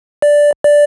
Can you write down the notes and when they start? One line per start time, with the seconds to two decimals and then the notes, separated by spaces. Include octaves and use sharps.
0.22 D5
0.64 D5